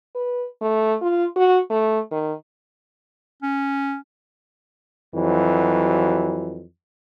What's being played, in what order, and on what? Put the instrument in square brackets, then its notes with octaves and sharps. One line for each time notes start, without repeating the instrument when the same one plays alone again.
[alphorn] B4
A3
F4
F#4
A3
D#3
[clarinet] C#4
[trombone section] F2 E3 F#3